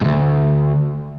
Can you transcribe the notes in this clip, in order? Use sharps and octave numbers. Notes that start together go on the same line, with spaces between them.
D2 G#2